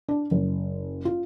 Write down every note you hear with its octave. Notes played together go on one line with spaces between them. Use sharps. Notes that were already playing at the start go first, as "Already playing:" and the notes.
D4
F#1
F4